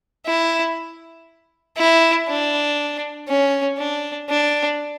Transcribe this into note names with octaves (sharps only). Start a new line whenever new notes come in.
E4
E4
D4
C#4
D4
D4